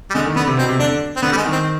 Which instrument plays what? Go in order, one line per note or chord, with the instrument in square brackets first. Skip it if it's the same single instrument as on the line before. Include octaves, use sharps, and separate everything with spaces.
[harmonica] G3
[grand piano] D3 [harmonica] G#3
[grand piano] D#3
[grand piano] D3 [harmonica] B3
[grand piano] C3
[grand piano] B2 [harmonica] C4
[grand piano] C3
[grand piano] D3 [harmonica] D4
[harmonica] C4
[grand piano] D3 [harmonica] B3
[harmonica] G3
G#3
[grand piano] D#3
[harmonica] C4